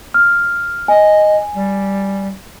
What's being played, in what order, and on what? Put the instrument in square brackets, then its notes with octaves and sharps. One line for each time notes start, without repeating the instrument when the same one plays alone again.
[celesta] F6
[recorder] D#5 [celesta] G#5
[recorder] G3